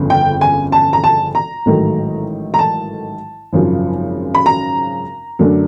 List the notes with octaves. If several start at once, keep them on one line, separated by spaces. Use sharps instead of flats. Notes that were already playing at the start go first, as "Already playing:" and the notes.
Already playing: G1 F2 C#3
G5
G#5
A5
A#5
A5
A#5
A1 G#2 D#3 F#3 A3
A#5
A5
G#1 F#2 C#3 F3
B5
A#5
F#2 D3 F#3 A3 D4